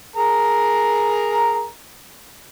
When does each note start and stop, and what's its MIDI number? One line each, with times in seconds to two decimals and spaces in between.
0.16 1.66 68
0.16 1.66 70
0.16 1.66 82